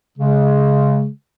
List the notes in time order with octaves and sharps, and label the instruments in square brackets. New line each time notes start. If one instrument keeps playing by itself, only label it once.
[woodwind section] C#3 G#3